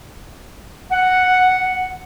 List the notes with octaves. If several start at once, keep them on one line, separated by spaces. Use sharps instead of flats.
F#5